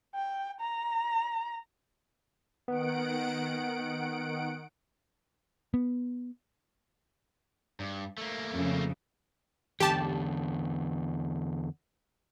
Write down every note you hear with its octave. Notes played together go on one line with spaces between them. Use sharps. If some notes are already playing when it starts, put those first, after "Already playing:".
G5
A#5
D#3 B3 F#5 D7
B3
G2
A3 A#3
F2 C#3
E2 D3 G4 A5